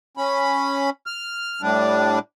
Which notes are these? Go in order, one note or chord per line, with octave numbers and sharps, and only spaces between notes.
C#4 B5
F6
A2 G3 D4